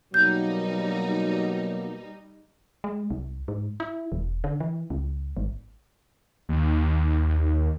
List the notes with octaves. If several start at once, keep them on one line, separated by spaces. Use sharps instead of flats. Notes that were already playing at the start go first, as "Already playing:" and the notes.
B2 F#3 G3 A#3 D#4 G6
G#3
C2
G#2
E4
E1
D3
E3
C#2
G#1
D#2